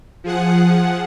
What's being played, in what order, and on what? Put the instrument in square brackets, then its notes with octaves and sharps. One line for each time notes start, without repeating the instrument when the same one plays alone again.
[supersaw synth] F3 G#4 F#5